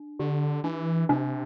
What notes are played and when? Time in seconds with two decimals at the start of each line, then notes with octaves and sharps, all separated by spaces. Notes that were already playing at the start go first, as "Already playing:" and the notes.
Already playing: D4
0.19 D3 G4
0.64 E3 D4
1.09 C3 D4